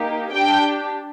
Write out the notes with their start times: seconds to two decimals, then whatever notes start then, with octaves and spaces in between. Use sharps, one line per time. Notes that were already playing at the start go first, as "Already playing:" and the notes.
Already playing: A#3 D#4 G4
0.31 D4 G4 G5